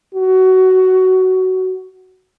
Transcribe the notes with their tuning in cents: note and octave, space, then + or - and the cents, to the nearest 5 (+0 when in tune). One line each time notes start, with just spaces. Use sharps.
F#4 +15